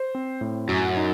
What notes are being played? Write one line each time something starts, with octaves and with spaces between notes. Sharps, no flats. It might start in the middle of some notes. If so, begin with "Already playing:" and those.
Already playing: C5
C4
A2
F#2 F#3
D#4